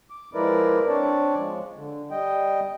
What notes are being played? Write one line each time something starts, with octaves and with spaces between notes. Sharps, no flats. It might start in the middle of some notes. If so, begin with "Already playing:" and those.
D6
F3 G#3 E4 A#4 B4 D5
C4 D4 C#5 D5 A5
F3 G#3
D3
G3 D#5 G5